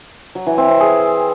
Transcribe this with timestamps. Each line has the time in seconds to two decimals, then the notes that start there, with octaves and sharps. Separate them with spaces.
0.35 F#3
0.46 E3
0.58 C4
0.69 C4
0.80 G#4